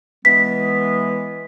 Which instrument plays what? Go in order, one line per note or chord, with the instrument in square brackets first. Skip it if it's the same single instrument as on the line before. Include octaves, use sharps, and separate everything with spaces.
[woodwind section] E3 G#3 B3 [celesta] B6